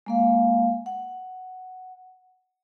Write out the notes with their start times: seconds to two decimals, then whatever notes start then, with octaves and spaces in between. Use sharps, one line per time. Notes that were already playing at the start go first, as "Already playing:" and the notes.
0.06 G#3 A#3 F5
0.86 F#5